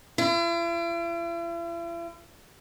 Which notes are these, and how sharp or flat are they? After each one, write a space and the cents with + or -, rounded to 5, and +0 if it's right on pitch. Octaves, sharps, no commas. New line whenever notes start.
E4 +45